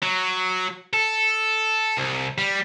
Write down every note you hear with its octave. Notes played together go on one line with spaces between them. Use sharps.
F#3
A4
C2
G3